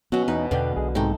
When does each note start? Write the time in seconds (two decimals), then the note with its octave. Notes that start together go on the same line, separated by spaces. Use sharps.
0.12 B2 F#3 B3 C#4 F#4
0.28 E2 C#4 D#4 B4
0.51 E2 B2 D3 B3 D5 F5 G5
0.76 B1 G#4 D#5
0.95 G#2 C3 A3 D#4 G5